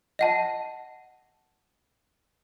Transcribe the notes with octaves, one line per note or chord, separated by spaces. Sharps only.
D#5 F#5 A5